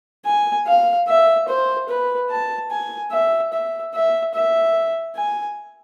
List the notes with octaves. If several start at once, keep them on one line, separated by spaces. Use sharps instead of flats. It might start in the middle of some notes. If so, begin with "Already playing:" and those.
G#5
F5
E5
C5
B4
A5
G#5
E5
E5
E5
E5
G#5